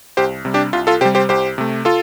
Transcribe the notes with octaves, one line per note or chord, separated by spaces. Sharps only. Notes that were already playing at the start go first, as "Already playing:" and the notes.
C2 G4 C5
C3 G3
D4 G4
C2 F4
F4 A4
C3 G3 G4 C5
G4 C5
C2 G4 C5
C3 A3
F4 A4